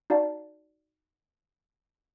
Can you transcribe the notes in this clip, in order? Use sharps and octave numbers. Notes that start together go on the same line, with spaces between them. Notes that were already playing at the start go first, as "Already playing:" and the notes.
D#4 F#4 D5 F5 A5